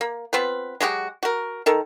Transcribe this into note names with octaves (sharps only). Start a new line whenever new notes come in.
A#3
B3 C4 F4 B4
F#3 G#3 F#4 G4
F#4 A#4
D#3 A4 A#4